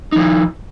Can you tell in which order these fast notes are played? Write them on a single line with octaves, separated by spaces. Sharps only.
D#4 F3 E4